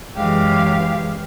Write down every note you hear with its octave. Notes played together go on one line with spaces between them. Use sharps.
F#2 E3 G#3 G4 F5